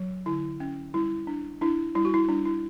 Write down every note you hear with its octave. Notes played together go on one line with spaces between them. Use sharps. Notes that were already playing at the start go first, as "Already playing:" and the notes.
Already playing: F#3
D3 E4
C#4
G3 E4
D4
D4 E4
G3 E4
F#4
E4
G3 D4
E4